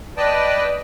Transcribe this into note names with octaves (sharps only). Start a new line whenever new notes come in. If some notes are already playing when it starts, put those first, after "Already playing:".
B4 D5 D#5 G5 A5